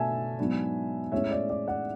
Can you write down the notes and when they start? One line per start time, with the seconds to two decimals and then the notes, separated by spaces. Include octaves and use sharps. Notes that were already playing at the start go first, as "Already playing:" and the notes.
Already playing: B2 A3 D4 E5 G#5 A5
0.39 G#2 F#3 B3 D4
1.12 A2 G#3 C#4 C#5 E5
1.31 D5
1.50 D5
1.67 D5 F#5